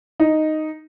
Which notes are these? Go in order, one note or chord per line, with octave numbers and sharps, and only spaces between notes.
D#4